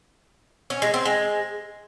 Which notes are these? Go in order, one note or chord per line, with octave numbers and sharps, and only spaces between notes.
C#4
G#3
C4
G#3